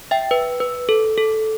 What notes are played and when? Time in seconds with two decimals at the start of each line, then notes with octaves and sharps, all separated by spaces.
0.11 E5 G5
0.31 B4
0.60 B4
0.89 A4
1.18 A4